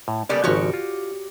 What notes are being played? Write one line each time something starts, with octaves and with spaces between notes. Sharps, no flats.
A2
C#3 G3 A#3 B3 A4 D5
G#1 C#3 F3 F#4 G4 C#5
F4